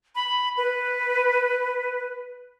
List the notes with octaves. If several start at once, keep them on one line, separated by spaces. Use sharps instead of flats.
B5
B4